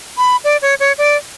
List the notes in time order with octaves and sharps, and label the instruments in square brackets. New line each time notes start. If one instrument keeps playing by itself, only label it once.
[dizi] B5
D5
C#5
C#5
D5